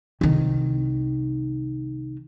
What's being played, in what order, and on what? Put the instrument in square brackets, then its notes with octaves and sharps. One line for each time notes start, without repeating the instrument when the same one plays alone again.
[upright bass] C2 D#3